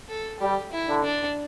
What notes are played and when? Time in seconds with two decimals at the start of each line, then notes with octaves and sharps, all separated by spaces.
0.09 A4
0.40 G3 G4
0.72 E4
0.87 D3
1.04 D4